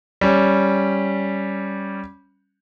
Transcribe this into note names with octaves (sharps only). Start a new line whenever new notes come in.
G3 C#4